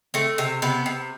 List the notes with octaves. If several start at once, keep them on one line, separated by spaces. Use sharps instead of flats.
A3 C4
C3
C3 B3
C3